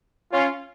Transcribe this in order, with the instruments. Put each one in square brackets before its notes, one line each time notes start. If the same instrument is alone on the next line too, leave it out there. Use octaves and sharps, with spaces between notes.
[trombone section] C#4 F4